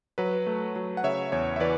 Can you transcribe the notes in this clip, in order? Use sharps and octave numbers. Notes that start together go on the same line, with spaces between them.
F#3 B4
A3
F#3
F#5
C#3 C#5 E5
E2 C#5
E5
E3 B4 D5